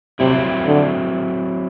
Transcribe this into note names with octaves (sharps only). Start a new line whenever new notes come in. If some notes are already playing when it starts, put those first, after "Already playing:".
C3 F#3 C4 E4
D3